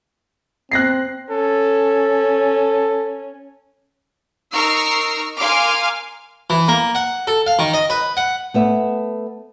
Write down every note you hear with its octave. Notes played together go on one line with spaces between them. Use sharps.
C4 F#6 A#6 C7
C#4 A4
D#4 A#4 A#5 C#6 E6 C7
A#4 F5 G#5 C6 D6 F6
E3
A#3
F#5
A4
F5
D#3
D#5
B4
F#5
A3 B3 E5